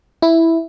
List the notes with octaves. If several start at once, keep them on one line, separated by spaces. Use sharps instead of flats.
E4